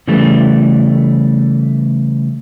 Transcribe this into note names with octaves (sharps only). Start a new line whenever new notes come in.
C#3 E3 G3 A3